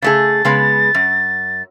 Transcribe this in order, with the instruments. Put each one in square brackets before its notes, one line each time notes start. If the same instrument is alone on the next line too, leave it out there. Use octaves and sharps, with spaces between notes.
[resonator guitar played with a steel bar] C#3 A3 G#4 [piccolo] A6
[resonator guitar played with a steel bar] C#3 G#3 B3
F#2